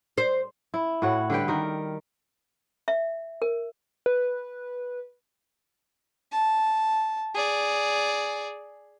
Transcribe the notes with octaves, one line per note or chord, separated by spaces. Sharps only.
C5
E4
A2 F#4 C#5
D3 G3 B4 G5
D#3 A#4 G5
E5
A#4
B4
A5
G#4 D5